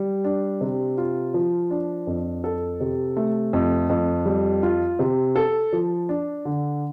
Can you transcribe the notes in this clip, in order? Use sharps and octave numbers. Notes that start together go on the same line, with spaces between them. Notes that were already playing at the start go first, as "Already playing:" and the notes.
Already playing: G3
D4
C3
F4
F3
D4
F2
A4
C3
A3
F2
F2
G3
F4
C3
A4
F3
D4
D3